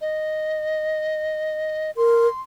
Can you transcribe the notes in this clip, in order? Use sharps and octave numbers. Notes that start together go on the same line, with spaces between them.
D#5
A#4 C6